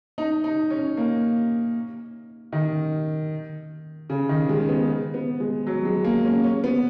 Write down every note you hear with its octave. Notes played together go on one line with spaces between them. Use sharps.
D#4
D#4
C#4
A#3
D#3
C#3
D#3
G#3
B3
B3
G#3
F#3
G#3
A#3
C#4
C#4
B3